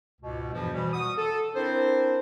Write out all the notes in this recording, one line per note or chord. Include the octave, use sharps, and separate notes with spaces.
C#2 G#2 B2
E2 G2 B2 E3 F3
B2 E3 G3
F#4 D#6
A4
C4 D4 E4 A#4 C5